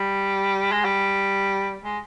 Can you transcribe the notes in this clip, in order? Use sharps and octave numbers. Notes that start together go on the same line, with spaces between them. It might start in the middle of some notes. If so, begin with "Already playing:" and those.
Already playing: G3
G#3
G3
G#3